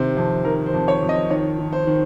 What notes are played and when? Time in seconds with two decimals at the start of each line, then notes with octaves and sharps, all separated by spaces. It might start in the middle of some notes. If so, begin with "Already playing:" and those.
Already playing: C3 D#3 C5
0.17 F2 C5
0.45 D#3 A#4
0.66 C5
0.73 F2
0.88 C#5
1.02 F2
1.09 D#5
1.30 D#3 C#5
1.59 D#3
1.73 C5
1.87 D#3